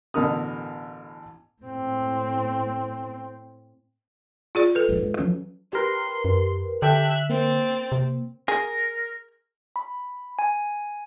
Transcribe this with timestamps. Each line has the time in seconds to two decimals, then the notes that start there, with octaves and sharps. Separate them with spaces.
0.14 A1 B2 D3 A#4 D#6
1.62 A2 C4
4.55 F4 G#4 D5
4.75 A4 B4
4.89 D#1 A#1 G#2
5.01 G#2
5.19 F3 F#3 C#4
5.73 G4 A#4 B4 C6
6.25 F#2
6.82 D3 G4 A4 E5 G5 F#6
7.30 A#3 C4 A6
7.92 C3
8.48 G#4 A#4
9.76 B5
10.39 G#5